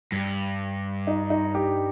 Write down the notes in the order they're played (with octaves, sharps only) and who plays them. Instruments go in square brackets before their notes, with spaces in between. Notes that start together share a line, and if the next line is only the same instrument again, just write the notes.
[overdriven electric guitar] G2
[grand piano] D#4
D#4
G4